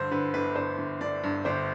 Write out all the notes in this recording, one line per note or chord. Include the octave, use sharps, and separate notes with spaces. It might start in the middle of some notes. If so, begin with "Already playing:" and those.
Already playing: G2 D3 C5
D3 B4
G1 B4
G1 C5
G1
G1 D5
G2
G1 C5